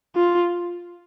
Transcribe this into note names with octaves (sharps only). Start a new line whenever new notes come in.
F4